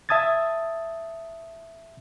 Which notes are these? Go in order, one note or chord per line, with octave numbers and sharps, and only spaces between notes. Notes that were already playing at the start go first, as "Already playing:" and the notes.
E5 A5 D#6 G#6 A6